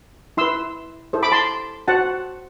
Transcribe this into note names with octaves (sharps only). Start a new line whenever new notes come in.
E4 B4 C6 E6
E4 A4 C5
B5 D6
A5 C6
F#4 C5 F#5 A5